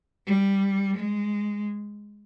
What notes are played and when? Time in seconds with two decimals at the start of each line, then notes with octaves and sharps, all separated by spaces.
0.26 G3
0.97 G#3